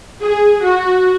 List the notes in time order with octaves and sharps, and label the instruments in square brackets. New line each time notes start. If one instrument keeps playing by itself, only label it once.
[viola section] G#4
F#4